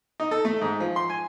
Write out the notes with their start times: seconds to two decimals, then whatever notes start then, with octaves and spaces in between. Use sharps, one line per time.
0.20 D#4
0.31 A4
0.45 A3
0.61 G#2
0.80 F3
0.96 C6
1.10 G#5